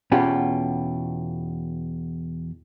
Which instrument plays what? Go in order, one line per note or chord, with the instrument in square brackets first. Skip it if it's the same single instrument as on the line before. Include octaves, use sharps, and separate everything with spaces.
[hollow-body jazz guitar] E2 B2 C#4 F4 G4 B5